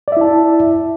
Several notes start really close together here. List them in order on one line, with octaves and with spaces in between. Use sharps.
D5 E5 E4 A5